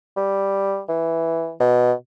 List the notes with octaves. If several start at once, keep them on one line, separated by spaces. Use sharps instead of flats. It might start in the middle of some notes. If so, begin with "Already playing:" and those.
G3
E3
B2